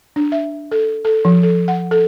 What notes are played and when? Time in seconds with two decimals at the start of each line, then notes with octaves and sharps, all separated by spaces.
0.16 D4
0.32 E5
0.72 A4
1.05 A4
1.25 F3
1.43 A4
1.68 F#5
1.91 A4